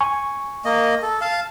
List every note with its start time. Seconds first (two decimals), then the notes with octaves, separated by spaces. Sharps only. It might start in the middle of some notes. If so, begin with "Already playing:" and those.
0.01 G#5 C#6
0.65 A#3 D#5
1.03 A4
1.21 F5 A5